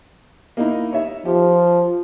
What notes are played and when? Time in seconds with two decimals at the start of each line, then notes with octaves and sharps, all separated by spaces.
0.57 A#3 D#4 E4
0.91 D#4 C#5 E5
1.25 F3 G4